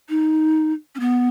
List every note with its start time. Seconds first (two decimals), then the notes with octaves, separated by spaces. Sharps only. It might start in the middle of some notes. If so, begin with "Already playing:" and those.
0.09 D#4
0.95 C#4
1.00 B3